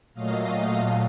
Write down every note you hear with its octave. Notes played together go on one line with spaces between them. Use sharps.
A#2 F#3 A3 D#5 F5